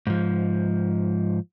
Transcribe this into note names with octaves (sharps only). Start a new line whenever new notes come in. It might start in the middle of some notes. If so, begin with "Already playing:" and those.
G#2 F3